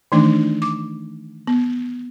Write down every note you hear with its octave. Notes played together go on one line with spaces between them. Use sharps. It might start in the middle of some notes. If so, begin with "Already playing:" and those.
D#3 E3 A3 D4 D#4
D6
B3